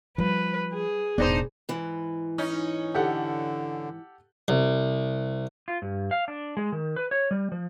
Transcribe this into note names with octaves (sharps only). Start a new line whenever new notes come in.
F3 G3 B4
G#4
E1 A2 B3 D4 D#4 C5
G#2 E3
C#4 D#4
D3 G4 A4 F#5
C2
F4
G2
F5
D4
G#3
D#3
B4
C#5
G3
F3